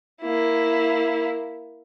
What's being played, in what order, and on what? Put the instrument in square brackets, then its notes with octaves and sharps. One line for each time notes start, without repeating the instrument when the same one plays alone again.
[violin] A#3 E4